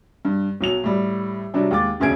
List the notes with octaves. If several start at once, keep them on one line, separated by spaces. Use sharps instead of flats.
G2
B1 F#3 F7
A2 G3
C3 F#3 G3 D4
D#2 G#3 D6 A6
E1 D2 C#3 G#4 G#6 D7